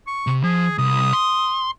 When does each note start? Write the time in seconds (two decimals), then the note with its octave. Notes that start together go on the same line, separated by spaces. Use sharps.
0.07 C#6
0.27 C3
0.43 F3 G#4
0.78 C2 D#6
1.13 C6